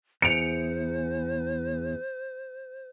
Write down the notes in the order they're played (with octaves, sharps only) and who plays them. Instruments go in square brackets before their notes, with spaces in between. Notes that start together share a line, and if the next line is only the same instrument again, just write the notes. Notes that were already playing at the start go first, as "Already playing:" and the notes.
[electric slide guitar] E2 [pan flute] C5 [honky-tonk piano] C#7 D7 F7